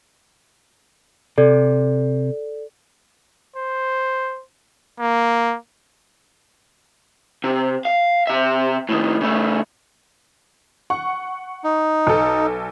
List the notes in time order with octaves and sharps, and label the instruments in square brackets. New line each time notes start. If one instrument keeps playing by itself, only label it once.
[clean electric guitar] C3 [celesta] A4 D5
[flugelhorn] C5
A#3
[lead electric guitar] C3
F5
C3 E5
A2 D#3
C#3 A3
[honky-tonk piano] F#5 C#6
[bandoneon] D#4
[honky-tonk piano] B1 A4